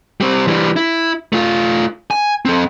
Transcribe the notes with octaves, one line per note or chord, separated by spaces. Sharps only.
G3 C4
E3 G3
E4
A3 F4
G#5
C4 A4